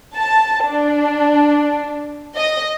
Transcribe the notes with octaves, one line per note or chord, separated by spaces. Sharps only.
A5
D4
D#5